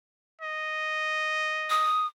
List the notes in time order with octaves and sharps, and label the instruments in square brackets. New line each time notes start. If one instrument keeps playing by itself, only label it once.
[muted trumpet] D#5
[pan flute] D#6